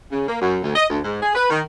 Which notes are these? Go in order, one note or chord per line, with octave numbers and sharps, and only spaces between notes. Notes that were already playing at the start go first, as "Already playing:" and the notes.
C#3
A#3
F#2
D2
D#5
D2
G#2
G#4
B4
D#3